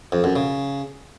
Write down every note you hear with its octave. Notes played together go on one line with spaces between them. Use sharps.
F2
F#2
C#3